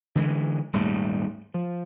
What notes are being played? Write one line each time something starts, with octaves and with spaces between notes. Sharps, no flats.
D3 E3 G#3
D#1 G#2 G3 A3
F3